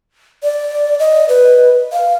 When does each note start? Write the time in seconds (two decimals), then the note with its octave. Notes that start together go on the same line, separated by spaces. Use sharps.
0.43 D5
0.99 D#5
1.29 B4
1.92 F5